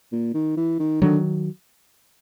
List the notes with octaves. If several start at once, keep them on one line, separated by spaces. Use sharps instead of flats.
A#2
D#3
E3
D#3
D3 D#3 F#3